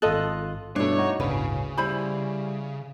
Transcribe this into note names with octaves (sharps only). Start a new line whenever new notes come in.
G#1 F4 A4 D#5 F#6
G2 B2 A3 D4 E4 C#5
D#4 F#4
G1 D2 A2 C#3 B4
G3 E4 C5 B5